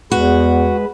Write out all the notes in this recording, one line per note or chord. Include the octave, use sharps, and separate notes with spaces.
E2 G#3 F#4 B4